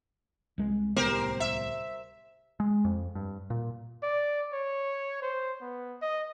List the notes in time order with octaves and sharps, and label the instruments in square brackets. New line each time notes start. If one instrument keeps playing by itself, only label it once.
[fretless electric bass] C2 G#3
[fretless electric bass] D1 C2 B3 [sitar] G4 A#4 C5
[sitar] E5
[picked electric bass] G#3
F2
G2
A#2
[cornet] D5
C#5
C5
B3
D#5